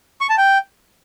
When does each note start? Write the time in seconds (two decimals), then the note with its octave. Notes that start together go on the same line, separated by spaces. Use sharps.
0.21 C#6
0.29 A5
0.38 G5